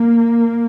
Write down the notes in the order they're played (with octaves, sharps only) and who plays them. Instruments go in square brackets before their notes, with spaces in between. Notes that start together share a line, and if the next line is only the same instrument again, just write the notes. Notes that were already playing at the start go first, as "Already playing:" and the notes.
Already playing: [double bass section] A#3